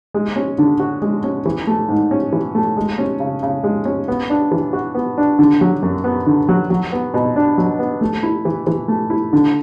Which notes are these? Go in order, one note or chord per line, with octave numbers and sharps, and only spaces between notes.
G#3
C#4
D3
F#4
G#3
C#4
E3
A3
G#2
C#4
E3
A3
G#3
C#4
C#3
C#3
G#3
C#4
B3
D4
E3
F#4
B3
D4
D3
F#3
F#2
B3
D3
F#3
F#3
B3
B2
D4
F#3
B3
A3
E4
E3
E3
A3
E4
D3